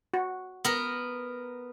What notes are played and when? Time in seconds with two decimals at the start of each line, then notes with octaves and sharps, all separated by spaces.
0.14 F#4
0.65 B3 A#4